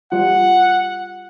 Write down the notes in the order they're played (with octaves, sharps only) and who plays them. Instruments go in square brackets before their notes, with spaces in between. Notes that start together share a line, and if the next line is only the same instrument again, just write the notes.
[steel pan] G3 F4 [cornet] F#5